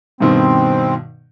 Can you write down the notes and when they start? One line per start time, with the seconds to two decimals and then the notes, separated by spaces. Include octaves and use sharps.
0.20 G2 B2 D#3 C4